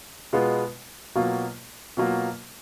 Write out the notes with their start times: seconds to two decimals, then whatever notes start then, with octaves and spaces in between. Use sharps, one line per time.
0.33 B2 G#3 B3 F4
1.15 B2 F#3 A#3 F4
1.97 B2 F#3 A#3 F4